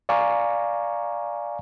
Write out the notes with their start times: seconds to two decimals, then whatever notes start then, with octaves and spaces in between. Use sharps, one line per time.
0.09 D5 F5 G#5 A#5 C#6